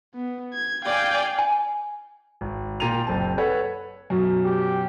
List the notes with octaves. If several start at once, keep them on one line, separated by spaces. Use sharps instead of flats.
B3
G#6
D5 F5 G5 G#5
G#5
G#1
A#2 G5 A#5 D#7 F7
F#1 C4 A5
A4 B4 C#5 F#5
F#2 B2
G4